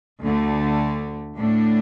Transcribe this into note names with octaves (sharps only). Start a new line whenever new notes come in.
D2 D3 A3
A2 A3 D4